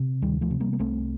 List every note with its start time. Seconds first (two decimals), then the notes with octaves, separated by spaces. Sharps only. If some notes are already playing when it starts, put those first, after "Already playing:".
Already playing: C3
0.22 D2 D#3 G3
0.41 F3 A3
0.50 C3
0.60 G3 A#3
0.73 A#3
0.79 C2 A3 C4